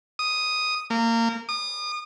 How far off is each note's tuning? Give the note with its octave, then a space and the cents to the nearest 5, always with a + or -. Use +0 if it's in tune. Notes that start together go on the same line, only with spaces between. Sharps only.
D#6 +0
A#3 -25
D#6 -35